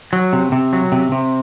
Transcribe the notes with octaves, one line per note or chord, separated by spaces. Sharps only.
F#3
C3
C3
F#3
C3
C3